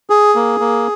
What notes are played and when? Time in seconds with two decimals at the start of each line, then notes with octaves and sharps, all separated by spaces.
0.10 G#4
0.35 A#3
0.60 A#3